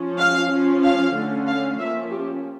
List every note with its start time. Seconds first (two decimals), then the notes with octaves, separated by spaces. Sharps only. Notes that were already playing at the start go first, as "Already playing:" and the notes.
Already playing: F3 C#4
0.18 F5
0.50 F3 C#4
0.83 F5
1.14 D3 A3 C#4
1.46 F5
1.78 F3 A#3 C#4 E5
2.11 G4